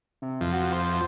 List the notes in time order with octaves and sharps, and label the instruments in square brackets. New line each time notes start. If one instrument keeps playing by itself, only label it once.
[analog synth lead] C3
[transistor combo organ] F2
[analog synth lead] F#4
C5